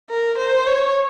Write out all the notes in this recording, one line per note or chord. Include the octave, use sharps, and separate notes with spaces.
A#4
C5
C#5